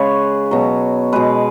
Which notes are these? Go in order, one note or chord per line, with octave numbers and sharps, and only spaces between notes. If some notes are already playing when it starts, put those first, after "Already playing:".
Already playing: C#3 G#3 B4 C#5
B2 F#3
B2 G#3 B4